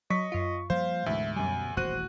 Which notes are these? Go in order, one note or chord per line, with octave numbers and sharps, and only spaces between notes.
F#3 D#5 C#6 B6
F#2 F4
F3 G3 A#3 C5 F5
D2 G#2 B2 E3 G#3 E5
F#2 B2 G3 G#5
D#1 A1 E2 F#4 C5 F#6 D#7